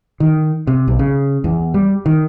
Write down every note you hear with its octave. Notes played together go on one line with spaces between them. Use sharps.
D#3
C3
B1
C#3
E2
G3
D#3